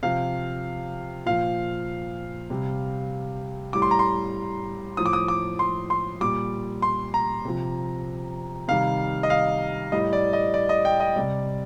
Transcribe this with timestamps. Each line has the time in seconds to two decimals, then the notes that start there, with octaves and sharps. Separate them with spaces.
0.03 C3 F3 F5
1.26 A#2 F3 F5
2.50 C3 G3
3.73 A2 G3 D6
3.82 C6
3.91 A#5
3.99 C6
4.97 A2 F3 D#6
5.06 D6
5.13 D#6
5.28 D6
5.59 C6
5.90 C6
6.21 A#2 G3 D6
6.82 C6
7.14 A#5
7.45 C3 F3
8.68 C3 D#3 G3 F5
9.23 D#5
9.30 F5
9.92 A2 G3 D#5
10.13 D5
10.33 D#5
10.54 D5
10.69 D#5
10.85 G5
11.00 D#5
11.16 C3 G3 D5